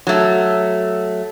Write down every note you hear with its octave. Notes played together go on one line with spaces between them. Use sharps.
F#3 A3